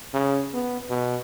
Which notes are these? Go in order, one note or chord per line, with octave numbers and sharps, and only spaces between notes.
C#3
B3
B2